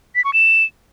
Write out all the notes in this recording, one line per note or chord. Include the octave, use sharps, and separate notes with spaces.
B6
C#6
E7